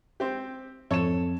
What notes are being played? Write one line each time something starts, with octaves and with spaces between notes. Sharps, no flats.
C4 G4
F2 A4 C#5 E7